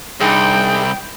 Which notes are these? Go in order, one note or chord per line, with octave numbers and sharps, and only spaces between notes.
C2 D4 D#4 G#4 G5